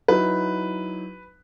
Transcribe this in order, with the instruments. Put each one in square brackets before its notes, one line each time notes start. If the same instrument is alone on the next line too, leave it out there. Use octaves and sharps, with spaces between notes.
[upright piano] F#3 D#4 E4 [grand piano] B4